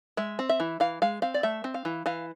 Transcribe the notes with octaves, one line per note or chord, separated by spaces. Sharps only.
G#3 E5
C4
E5
E3
E3 F5
G#3 F5
C4 F5
D5
A3 E5
C4
F5
E3
E3 F5